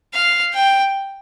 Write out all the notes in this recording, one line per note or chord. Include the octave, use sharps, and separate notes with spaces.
F5
G5